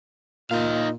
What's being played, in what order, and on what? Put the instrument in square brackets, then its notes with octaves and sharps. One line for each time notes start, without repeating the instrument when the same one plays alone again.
[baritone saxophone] A#2 [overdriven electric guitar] D#4 F5